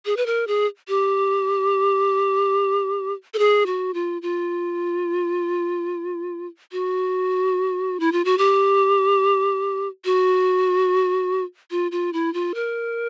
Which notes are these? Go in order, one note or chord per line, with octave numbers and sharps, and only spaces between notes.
G#4
B4
A#4
G#4
G4
A4
G#4
F#4
F4
F4
F#4
E4
F4
F#4
G4
F#4
F4
F4
E4
F4
A#4